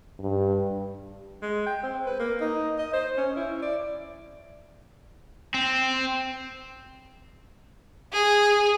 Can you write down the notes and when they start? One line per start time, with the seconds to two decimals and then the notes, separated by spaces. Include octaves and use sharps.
0.19 G2
1.42 G#3
1.66 G5
1.83 C4
2.06 B4
2.19 A#3
2.40 D#4
2.78 D#5
2.93 C5
3.17 C#4
3.36 E4
3.62 D5
5.54 C4
8.13 G#4